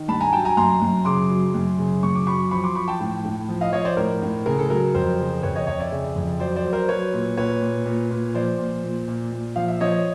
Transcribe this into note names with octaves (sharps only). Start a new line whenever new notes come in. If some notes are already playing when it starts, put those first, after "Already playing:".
Already playing: D#3
G2 A5 B5
G#5 A#5
F#3 G5 A5
G#5 A#5
F#2 A#5 C6
F#2
C#3 C6 D6
F#3
F#2
C#3
F#2 C#6
D6
F#3 B5 C#6
F3 B5 C#6
C6 D6
F3 B5 C#6
G5 A5
A2
A2
F3
D#5 F5
F3 C#5 D#5
C5 D5
A2 A#4
A2
C#3 A#4
A4
F#3 A#4
F2 A#4 C5
C#3
F2 B4 C#5
C#5 D#5
F2 C#5 D#5
D5 E5
C#3
F2
F#3 C5 D5
C5 D5
F#3
A#4 C5
F#3 B4 C#5
A#2
A#2 B4 C#5
A#2
A#2
A#2
F3 C5 D5
A#2
A#2
A#2
A#2
F3 F5
E5
F3 C#5 D#5